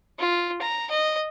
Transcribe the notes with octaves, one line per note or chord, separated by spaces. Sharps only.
F4
A#5
D#5